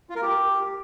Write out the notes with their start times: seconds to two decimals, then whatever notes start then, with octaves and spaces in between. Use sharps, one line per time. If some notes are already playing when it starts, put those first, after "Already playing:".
0.10 F4
0.16 A#4
0.22 G4